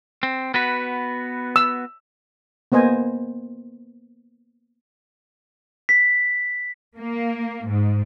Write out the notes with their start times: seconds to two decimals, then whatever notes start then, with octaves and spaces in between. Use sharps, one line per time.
0.23 C4
0.54 B3 F#4 B4
1.56 E6
2.72 A#3 B3 C5 D#5 G#5
5.89 B6
6.98 A#3
7.67 G#2